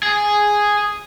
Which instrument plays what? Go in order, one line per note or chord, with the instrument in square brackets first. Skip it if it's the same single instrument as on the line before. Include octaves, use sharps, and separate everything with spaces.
[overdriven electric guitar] G#4